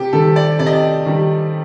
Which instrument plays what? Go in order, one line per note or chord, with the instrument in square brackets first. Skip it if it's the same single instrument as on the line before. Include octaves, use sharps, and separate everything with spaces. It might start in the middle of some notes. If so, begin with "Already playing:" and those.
Already playing: [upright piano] C3 G4
D#3 G3 A4
D5
C3 D5
D#5
D5
D#3 G3